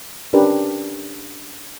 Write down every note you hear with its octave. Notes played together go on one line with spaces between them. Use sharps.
C#4 D4 G4 A#4 B4